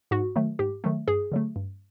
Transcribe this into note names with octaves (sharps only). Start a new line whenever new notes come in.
G#2 F#4
D#3 F#3 A3
G#2 G4
D#3 F#3 A3
G2 G#4
D3 F#3 A3
G2